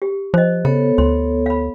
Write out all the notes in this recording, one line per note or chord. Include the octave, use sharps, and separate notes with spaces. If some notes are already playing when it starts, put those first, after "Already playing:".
G4
F3 C5 D#5
C#3 B3 A4 C#5
D2 C6
F5 B5